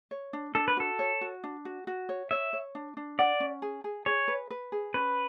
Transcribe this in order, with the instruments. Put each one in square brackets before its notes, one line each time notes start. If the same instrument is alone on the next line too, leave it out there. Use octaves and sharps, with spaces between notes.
[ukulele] C#5
D4
[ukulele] D4 [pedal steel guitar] A4
[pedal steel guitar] B4
[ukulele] F#4 [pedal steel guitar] A4
[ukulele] C#5
F#4
D4
F#4
F#4
C#5
[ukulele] C#5 [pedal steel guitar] E5
[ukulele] C#5
D4
D4
[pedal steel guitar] D5 [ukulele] F#5
[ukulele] C#4
G#4
G#4
[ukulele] G#4 [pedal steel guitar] C#5
[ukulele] B4
B4
G#4
[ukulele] C#4 [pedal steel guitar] B4